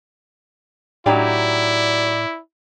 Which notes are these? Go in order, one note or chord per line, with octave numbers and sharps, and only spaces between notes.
A2 F#3 D#4 E4 G4 D5